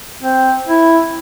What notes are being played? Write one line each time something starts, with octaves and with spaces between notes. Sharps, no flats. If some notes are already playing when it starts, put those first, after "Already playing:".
C4
E4